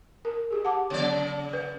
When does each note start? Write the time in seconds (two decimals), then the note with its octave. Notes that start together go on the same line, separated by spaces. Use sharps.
0.25 A#4
0.51 G4 G#4
0.65 F#5 A5 D6
0.90 C#3 F#3 B3 C#5 D5
1.53 B4